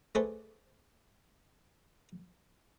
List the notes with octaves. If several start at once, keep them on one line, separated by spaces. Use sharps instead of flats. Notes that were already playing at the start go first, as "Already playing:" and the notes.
A3 G#4 B4 C5 D5